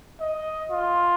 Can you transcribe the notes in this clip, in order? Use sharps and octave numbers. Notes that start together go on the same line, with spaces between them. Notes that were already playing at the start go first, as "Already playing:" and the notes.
D#5
F4